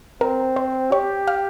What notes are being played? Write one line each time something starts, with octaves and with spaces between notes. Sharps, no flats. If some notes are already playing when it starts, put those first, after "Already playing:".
C4 A#4
C5
G4 C#5
F5